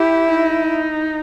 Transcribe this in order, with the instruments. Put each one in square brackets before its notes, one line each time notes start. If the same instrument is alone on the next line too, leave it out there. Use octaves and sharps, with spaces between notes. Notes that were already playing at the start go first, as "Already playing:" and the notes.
Already playing: [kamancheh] E4 [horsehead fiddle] G4
[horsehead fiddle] D#4